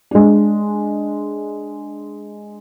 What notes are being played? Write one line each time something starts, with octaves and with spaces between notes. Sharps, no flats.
G#3 D4